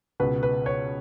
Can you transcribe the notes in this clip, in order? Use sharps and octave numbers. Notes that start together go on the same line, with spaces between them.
C#2 B2 B4
B4
C#5